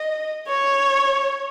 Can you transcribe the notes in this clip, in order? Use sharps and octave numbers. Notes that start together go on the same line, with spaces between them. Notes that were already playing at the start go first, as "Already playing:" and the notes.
Already playing: D#5
C#5